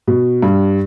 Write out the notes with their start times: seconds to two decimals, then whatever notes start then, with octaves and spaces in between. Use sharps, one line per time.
0.07 B2
0.42 G2